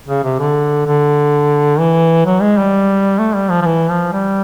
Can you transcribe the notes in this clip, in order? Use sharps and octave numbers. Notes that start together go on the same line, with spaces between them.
C#3
C3
D3
D3
E3
F#3
G#3
G3
A3
G3
F3
F3
E3
F3
G3